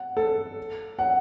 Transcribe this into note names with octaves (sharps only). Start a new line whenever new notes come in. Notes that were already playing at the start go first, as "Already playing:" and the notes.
Already playing: F#5
A4
F#5